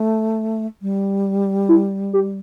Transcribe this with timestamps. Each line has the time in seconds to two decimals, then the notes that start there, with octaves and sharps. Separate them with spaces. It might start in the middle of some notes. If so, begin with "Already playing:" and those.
Already playing: A3
0.82 G3
1.69 E4
2.13 G4